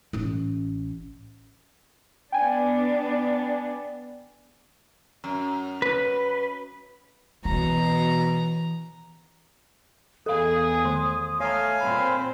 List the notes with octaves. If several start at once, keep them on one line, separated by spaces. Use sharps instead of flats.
A1 C#4
B3 D4 G5 G#5
F#2
B4
B2 E3 A#5
E2 G#4 A4 F5 D#6
D#3 C6
A3 C#5 F5 G#5 A#5
A#2 C4 B5